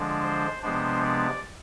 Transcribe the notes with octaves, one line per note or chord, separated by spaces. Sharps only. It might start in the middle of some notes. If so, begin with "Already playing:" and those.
Already playing: D3 F3 G#3 D4
C5
C3 F3 G#3 B3 D4 C5
D5